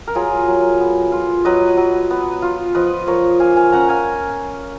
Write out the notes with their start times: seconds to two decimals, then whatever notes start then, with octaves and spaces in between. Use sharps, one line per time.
0.08 A#4
0.15 F#3 F4 G#4
0.48 F#3
0.81 B3
1.12 F4
1.45 F#3 B4 D#5
1.77 F#3
2.11 B3
2.42 F4
2.75 F3 B4 D#5
3.07 F3 A#4 C#5
3.40 A#3 F5 G#5
3.57 F5 G#5
3.72 C#4 F#5 A#5
3.89 F5 G#5